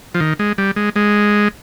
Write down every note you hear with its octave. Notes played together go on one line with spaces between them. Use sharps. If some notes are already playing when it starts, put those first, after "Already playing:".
F3
D#3
G#3
G3
G#3
G#3